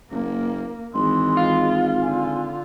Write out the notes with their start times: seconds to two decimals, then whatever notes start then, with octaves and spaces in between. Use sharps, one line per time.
0.11 F#1 A#3
0.94 G#1 E3 G#3 C6
1.37 F4
2.02 D3 G#5